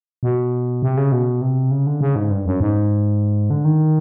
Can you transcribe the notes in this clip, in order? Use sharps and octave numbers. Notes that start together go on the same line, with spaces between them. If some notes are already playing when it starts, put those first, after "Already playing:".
B2
C3
C#3
B2
C3
C#3
D3
C#3
G#2
G2
F#2
G#2
D3
D#3